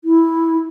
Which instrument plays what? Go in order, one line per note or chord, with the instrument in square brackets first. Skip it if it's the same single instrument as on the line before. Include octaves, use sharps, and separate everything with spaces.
[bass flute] E4